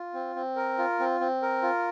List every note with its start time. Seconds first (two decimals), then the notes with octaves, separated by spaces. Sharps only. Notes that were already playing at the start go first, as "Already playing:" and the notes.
Already playing: F4
0.14 C4
0.36 C4
0.56 A#4
0.78 F4
1.00 C4
1.20 C4
1.42 A#4
1.63 F4